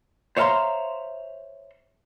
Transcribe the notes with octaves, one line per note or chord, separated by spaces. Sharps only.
C5 C#5 E5 F5 A#5 C6